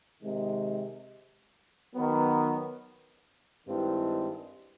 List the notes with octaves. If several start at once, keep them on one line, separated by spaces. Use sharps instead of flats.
C3 D#3 G#3
D#3 F#3 B3
G2 D#3 G#3 C4 E4